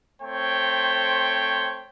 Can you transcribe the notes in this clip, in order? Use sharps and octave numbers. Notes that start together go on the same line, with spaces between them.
A3 C4 C5 C#5 G5